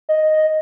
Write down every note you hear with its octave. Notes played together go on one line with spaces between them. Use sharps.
D#5